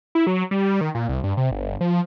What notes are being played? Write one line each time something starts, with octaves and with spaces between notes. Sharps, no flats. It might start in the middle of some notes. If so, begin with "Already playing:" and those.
E4
F#3
G3
D#3
A#2
C2
G2
C3
G1
F3